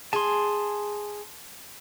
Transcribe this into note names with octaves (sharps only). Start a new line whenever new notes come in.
G#4 A5 C6